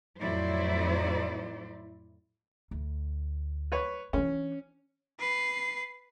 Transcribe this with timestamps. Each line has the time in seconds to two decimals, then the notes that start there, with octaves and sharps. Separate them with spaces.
0.19 F2 A2 F#3 E4 C5 D5
2.71 D2
3.72 B4 C#5
4.13 E3 C#4 D4
5.19 B4 C7